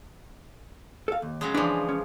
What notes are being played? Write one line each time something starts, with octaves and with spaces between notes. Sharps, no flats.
A4 F5
D#2
C#3 F#3 G#3
E3 F3 D4 D5
C#4